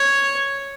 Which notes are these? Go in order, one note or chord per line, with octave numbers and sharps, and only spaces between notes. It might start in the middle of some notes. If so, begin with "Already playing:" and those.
Already playing: C#5